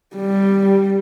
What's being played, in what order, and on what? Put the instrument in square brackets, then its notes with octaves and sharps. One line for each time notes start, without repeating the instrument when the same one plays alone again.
[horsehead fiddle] G3